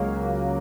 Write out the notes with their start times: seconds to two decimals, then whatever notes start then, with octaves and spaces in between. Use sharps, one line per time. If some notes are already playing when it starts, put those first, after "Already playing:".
Already playing: C#2 C#3 F#3 A#3